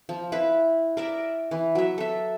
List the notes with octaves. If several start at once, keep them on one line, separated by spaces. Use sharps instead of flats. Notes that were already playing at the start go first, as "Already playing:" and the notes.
F3
E4 B4 B5
A#4 D5 E5
E3
F#3 E5
A4 E5